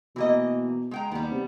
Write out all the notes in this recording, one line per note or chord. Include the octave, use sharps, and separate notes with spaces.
B2 E3 A#3 D#5
G#3 G5 A#5
D#2 G3 B3
C3